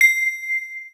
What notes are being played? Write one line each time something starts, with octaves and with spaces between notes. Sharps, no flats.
C7